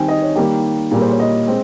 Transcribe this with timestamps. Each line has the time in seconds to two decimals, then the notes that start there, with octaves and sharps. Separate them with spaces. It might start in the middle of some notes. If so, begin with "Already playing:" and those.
Already playing: D#3 G3 C4 G5 G#5
0.08 D#5
0.22 C#5
0.36 D#3 G3 A#3 G4
0.91 A#2 G3 A#3 G#4
1.01 C5
1.11 C#5
1.20 D#5
1.48 G#3 C4